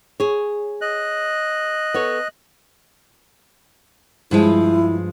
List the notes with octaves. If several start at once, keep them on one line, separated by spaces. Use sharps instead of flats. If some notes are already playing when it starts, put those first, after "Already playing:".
G#4 C#5
D#5 F#6
B3 A4 C#5
G2 F3 G#3 E4